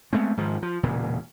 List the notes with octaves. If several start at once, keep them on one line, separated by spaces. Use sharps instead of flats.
G#3 A3 B3 C4
G#2 D#3 F3
F3
E1 A#2 C#3